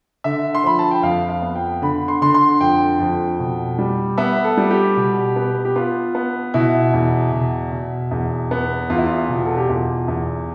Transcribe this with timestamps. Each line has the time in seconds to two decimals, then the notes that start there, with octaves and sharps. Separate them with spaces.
0.24 D3 E5
0.55 C6
0.64 F3 B5
0.79 A5
0.91 G5
1.03 F2 F5
1.29 F5
1.42 B3
1.55 G5
1.82 D3 B5
2.08 C6
2.22 D3 C6
2.34 C6
2.60 F2 G5
3.00 F2
3.39 B2
3.79 G3
4.18 B3 E5
4.44 A4
4.57 G3
4.71 G4
4.97 B2
5.36 B3
5.65 G4
5.76 B3 F4
6.15 B3
6.54 B2 E4
6.93 E2
7.32 B2
7.72 B2
8.11 E2
8.51 B3
8.90 E2 F4
8.98 E4
9.06 F4
9.29 B2
9.46 A4
9.57 G4
9.69 E2 F4
10.08 E2